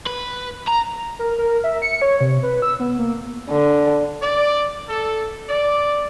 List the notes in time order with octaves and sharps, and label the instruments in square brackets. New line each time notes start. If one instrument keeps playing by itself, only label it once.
[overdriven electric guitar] B4
A#5
[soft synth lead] A#4
A#4
E5
C#7
C#5
C3
B4
E6
B3
A#3
[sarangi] D3
[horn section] D5
A4
D5